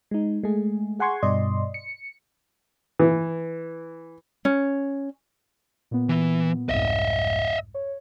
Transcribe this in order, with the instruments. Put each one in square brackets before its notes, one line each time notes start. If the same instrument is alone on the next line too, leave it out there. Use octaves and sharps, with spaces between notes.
[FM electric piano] G#3 D#4
G#3 A3 G#4
G#4 F#5 G#5 C6 C#6 G#6
G2 B2 D5 D#5 C6
C#7
[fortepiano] E3
[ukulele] C#4
[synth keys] A#2 B3
[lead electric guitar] E3
[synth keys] C2 F2 G#2 [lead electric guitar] D#5 E5
[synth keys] C#5